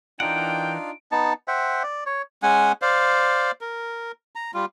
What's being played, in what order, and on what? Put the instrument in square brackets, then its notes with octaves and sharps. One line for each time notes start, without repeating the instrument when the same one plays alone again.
[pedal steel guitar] E3 A#4 F#5 [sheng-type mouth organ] D4 D#4 F4 [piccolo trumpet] G5 [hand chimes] D7
[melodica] B3 D#4 A5
C5 E5 F#5 G5
D5
C#5
G#3 C#4 F#5 G#5
C5 D5 F5
A#4
A#5
G3 F4